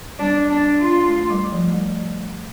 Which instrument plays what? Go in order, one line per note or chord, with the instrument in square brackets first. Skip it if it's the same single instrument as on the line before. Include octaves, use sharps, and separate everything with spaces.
[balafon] G3 [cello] D4
[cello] D4
F4
[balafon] A3
G3
F3
A3
G3